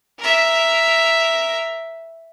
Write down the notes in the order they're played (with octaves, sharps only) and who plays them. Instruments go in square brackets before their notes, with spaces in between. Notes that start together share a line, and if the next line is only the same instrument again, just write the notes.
[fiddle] A#4 E5